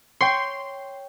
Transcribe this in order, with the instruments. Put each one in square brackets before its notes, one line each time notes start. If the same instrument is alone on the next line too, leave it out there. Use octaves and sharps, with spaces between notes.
[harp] C#5 G5 [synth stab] C6